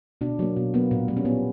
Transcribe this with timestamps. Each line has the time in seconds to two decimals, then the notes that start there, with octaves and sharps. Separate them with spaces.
0.21 B2 D4
0.39 F#3 A#3
0.56 B2
0.74 F#3 A#3 B3
0.91 A#2
1.08 G3 A#3
1.17 C#4
1.25 A#2 B3